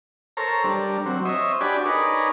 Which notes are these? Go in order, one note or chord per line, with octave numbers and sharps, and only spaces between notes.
A4 A#4 C5 C#5 A#5
G3 D4 A#4
F#3 C4
C5 C#5 D#5 E5
D4 F#4 G4 D5 G#5 B5
D#4 G#4 A#4 B4 C#5 D5